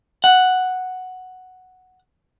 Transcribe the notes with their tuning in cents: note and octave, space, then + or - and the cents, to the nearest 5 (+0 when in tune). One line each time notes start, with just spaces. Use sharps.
F#5 +0